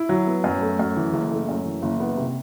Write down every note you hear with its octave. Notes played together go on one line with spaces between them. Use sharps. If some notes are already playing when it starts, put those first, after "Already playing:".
Already playing: E4
F#3
B3
F#2
A3
F#2
E3
F#1
A3
F#2
E3
F#1
B3
C3